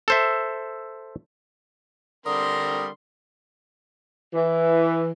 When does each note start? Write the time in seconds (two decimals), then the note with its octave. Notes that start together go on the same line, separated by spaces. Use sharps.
0.08 A4 C5 E5
2.26 D3 G3 C4 A#4 C6 D#6
4.33 E3